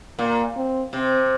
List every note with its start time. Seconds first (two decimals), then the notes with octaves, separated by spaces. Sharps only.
0.19 A#2 A#3
0.56 C4
0.93 C3 C4